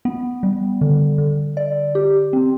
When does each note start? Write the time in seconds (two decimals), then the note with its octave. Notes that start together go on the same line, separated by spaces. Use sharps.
0.05 B3
0.43 G3
0.81 D3
1.18 D3
1.57 D5
1.95 G4
2.33 C4